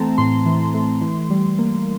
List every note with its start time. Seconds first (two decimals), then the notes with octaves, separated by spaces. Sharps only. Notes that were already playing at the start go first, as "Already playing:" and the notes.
Already playing: E3 A3 C4 A5 A#5
0.18 A2 C6
0.46 E3
0.74 A3
1.01 E3
1.30 G3
1.59 A#3